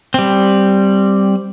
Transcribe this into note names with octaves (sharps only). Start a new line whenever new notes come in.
G3 C4